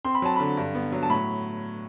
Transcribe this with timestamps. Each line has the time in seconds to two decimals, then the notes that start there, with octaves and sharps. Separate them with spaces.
0.05 C4 C6
0.15 B5
0.22 F#3 A5
0.36 D3 B5
0.57 G2
0.75 B3
0.92 F#3
1.03 A5
1.10 A2 B5